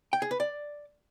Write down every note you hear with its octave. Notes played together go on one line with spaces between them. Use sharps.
G5
G#4
B4
D5